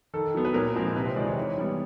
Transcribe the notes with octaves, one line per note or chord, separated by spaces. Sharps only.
D#3 A4
F#3 B3
B4
A#2 A#4
F3 G#3 C4
C3 B4
C5
D#3 G#3 D5
C#5
E3
G3 B3